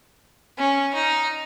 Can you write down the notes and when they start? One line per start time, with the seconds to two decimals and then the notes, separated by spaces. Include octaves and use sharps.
0.58 C#4
0.94 D#4